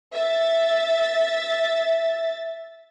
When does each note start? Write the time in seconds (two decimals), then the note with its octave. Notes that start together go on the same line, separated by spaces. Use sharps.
0.14 E5 A6